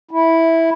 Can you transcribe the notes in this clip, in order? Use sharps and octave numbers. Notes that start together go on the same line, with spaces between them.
E4